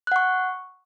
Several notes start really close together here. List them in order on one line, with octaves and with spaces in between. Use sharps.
F#6 F#5 C#6